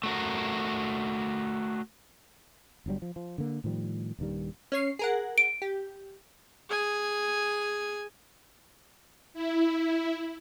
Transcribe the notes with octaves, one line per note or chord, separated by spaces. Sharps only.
A3 F#4 A#4
G1 G2 F#3 G3
F3
F3
D3 A#3
A2 D#3 F3 G3
D#1 G2 D#3 G3
C#4 C#5 C7
G#4 A#4 F#5
D7
G4
G#4 G#5
E4